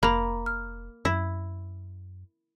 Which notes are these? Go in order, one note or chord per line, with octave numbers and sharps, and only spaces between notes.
F1 A#3 A#5 B5
F6
F#2 E4